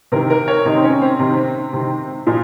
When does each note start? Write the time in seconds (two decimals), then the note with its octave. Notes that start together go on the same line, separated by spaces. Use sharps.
0.12 C3 D#3 A#4
0.30 A#4
0.48 C#5
0.65 C3 D#3 D#4
0.76 C4
0.84 C#4
1.02 C4
1.19 C3 D#3
1.73 C3 D#3
2.27 A#2 F3